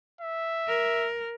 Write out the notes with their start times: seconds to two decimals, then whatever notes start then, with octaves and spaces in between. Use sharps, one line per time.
0.21 E5
0.67 A#4